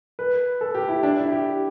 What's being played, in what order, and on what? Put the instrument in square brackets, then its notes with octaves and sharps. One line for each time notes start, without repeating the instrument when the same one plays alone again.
[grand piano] B4
A4
G4
E4
D4
E4
G4